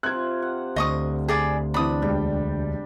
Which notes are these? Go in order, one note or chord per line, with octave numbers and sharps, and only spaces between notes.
C3 C4 F4 F#6 G#6
F#5
D2 D#5 C#6 D#6
G#4 D5 B5
E3 C4 D4 B5 D#6
E1 G3 G5